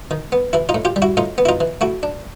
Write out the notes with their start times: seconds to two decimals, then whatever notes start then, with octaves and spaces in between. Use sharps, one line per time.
0.11 D#3
0.32 B3
0.53 E3 E4
0.69 D#4 F4
0.74 A2
0.85 F4 G4
0.96 G3
1.02 E4 F#4
1.17 A2 D#4 F4
1.38 B3
1.45 E4
1.49 D#4 F4
1.60 E3
1.81 A3 E4 F#4
2.03 D4